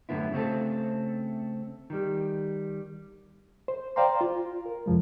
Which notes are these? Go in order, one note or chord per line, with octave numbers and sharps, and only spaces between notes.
F#2 A2 D3 B3 E4
C#3 A3 C4 A4
D#3 G3
C5
C5 D5 F5 G5 A#5 C6
F4
A#4
C2 F2 F3 G#3